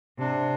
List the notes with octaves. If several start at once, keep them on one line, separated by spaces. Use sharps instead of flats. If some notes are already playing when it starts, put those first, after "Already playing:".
C3 D4